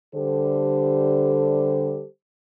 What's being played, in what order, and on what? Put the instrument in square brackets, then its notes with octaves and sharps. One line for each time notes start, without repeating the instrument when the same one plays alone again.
[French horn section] D3 G3 G4 A4 C5